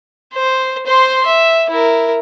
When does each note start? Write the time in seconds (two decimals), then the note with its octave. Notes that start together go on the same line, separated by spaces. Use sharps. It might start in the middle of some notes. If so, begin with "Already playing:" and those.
0.34 C5
0.87 C5 C6
1.26 E5
1.71 E4 A#4